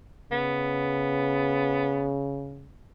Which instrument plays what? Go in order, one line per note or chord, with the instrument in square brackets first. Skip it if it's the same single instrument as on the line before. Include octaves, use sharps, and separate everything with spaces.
[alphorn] C#3 [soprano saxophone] B3